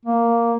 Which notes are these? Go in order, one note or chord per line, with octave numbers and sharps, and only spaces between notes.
A#3